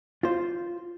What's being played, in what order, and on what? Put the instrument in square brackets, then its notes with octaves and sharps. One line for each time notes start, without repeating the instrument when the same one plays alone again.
[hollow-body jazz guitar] F4 C5